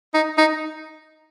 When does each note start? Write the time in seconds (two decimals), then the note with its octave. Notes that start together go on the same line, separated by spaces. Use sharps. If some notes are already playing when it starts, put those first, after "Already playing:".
0.14 D#4
0.38 D#4